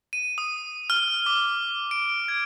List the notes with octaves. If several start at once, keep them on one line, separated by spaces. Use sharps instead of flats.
D#7
D#6
F6
D6
D7
G#6